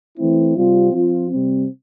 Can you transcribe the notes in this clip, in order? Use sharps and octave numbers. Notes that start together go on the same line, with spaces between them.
E3 A3 C4 E4
C3 G3 C4 F4
F3 C4 F4
C3 G3 C4